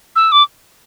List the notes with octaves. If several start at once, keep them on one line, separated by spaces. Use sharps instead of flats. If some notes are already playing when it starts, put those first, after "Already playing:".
E6
D6